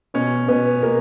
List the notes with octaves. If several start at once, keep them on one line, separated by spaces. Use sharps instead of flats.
B2 C#4
B2 B3
B2 A#3